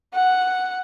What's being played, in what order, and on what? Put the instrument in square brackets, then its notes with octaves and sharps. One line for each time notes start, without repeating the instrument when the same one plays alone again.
[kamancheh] F#5